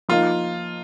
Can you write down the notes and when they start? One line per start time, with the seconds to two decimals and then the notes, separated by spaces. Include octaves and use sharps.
0.09 F3 A#3 D#4 F4